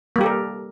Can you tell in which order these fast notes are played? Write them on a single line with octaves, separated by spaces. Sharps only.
A#3 G3 G4 A4 A#4